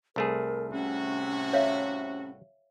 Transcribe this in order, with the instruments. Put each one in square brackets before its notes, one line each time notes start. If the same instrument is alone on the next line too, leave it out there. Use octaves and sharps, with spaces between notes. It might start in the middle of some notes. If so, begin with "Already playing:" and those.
[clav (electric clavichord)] C2 A3 G#4 [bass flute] A#4
[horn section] A2 C3 F#4 [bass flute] C#4
[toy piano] C#5 E5 F5